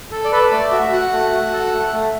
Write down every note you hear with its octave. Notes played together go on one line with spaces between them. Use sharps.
A4
D5
A4 B4
A3 D5
F#4 E5
F#4 F#5
A3
F#4
A4
A3
A3